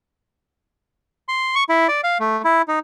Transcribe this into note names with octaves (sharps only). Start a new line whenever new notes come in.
C6
C#6
E4
D5
F5
A3
E4
D#4